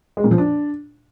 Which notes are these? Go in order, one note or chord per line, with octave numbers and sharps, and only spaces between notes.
G#3
A#2
F3
D4